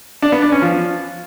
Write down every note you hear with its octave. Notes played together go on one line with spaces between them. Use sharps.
D4
B3
D4
C#4
F3